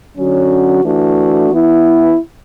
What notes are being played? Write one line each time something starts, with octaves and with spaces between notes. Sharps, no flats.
D3 F#3 C#4 F#4
E3 A3 D4 F#4
E3 B3 E4